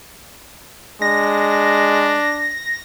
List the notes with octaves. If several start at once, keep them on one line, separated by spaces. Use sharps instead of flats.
G#3 D4 A#6